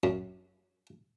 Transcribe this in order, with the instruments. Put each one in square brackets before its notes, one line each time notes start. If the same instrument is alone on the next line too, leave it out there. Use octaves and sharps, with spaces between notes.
[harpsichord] F#2